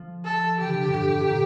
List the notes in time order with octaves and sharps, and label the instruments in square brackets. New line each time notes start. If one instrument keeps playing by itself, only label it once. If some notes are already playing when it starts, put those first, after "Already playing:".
Already playing: [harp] F3
[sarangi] A4
[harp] E3 [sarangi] G4
[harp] D3
C3
D3
G2
A2
A2
A#2